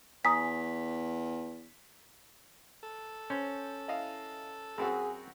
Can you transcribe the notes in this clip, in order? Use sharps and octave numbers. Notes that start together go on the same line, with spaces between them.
E2 G#5 A#5 D#6 B6
A4
C#4 C5
E4 D#5 F5
F#2 C4 F#4 G#4